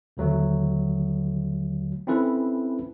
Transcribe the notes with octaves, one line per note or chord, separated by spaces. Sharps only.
D#2 D3 F#3 A3
C4 C#4 E4 A4 B4